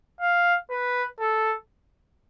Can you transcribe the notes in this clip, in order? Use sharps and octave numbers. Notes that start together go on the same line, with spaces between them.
F5
B4
A4